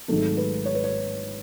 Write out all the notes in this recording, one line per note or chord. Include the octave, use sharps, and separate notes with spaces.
G#1 G#2 D#3 F#3 A3 A4
B4
C#5
B4
C#5